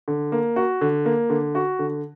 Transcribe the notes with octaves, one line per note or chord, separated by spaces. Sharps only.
D3
A#3
F#4
D3
A#3
D3
F#4
D3